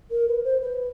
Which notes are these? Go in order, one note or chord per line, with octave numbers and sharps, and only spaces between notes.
A#4
B4
C5
B4